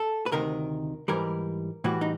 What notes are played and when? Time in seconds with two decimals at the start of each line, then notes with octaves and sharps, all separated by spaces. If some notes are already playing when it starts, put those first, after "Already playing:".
Already playing: A4
0.26 B4
0.32 D2 C3 D#3 A#4
1.08 G#2 E3 G3 A#4
1.84 A2 E3 G3 F#4
2.01 D#4